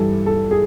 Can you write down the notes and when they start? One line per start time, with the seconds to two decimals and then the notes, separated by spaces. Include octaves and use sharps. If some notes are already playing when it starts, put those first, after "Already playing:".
Already playing: G2 E3 G3 A4
0.26 A4
0.51 G#4